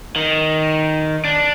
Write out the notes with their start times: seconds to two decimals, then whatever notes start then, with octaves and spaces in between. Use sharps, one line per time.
0.16 D#3
1.24 D4